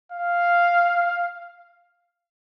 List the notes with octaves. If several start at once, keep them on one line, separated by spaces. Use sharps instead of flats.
F5